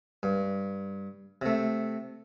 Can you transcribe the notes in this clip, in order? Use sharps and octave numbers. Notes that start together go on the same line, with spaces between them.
G2
C3 A3